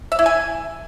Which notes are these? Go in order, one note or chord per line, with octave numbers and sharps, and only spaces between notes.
E5
E4
G#5